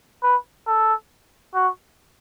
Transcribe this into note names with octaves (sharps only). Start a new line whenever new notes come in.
B4
A4
F#4